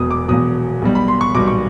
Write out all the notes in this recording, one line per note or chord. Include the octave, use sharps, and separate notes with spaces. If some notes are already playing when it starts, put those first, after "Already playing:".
Already playing: E1 E2 B2 D#6
D6
E1 E2 B2 D#6
B1 B2 G3
B5
C6
C#6
B1 B2 G3 D6
C#6